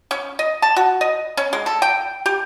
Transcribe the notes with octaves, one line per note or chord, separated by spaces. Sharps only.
C#4
D#5
A5
F#4
D#5
C#4
G#3
A4
G5
G4